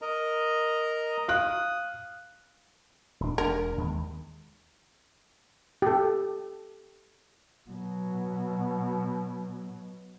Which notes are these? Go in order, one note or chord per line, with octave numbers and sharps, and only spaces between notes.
A#4 D#5 A#5
F5 D#6 F#6
D#1 D4
E1 D4 A#4
D#2 D#3 G#3
G4 A4
B2 F#3